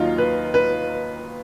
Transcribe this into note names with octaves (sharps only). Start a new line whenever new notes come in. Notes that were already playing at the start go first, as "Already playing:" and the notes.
Already playing: D#2 D#3 F#3 D#4 F4
B4
B4